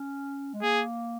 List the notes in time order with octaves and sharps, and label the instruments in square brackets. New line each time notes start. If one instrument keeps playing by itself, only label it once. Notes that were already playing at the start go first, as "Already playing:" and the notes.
Already playing: [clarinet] C#4
G#3
[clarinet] A#3 [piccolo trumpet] G#4